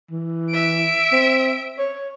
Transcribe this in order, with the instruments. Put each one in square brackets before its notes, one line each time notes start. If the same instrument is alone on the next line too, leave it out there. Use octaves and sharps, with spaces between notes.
[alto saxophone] E3
[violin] E5 D7
[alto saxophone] C4
C#5